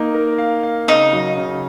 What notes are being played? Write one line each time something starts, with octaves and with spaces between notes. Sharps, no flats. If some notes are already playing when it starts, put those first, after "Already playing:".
Already playing: A#3 D#4
A#4
F5
F5
C#3 D#4
F#3
C#3